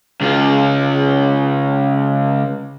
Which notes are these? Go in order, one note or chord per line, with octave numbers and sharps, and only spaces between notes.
C#2 F4